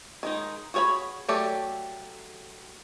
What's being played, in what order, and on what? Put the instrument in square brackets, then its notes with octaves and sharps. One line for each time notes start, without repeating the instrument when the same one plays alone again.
[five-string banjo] D#3 G#3 D#4
F#4 G#4 C#5 G#5 B5
F#3 A3 G4 A4 D5